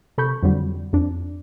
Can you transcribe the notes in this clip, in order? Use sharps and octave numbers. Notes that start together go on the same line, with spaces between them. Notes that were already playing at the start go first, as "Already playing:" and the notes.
C3 A4 B5 C#6 G6
F2 D3 F#3 G3
F2 D4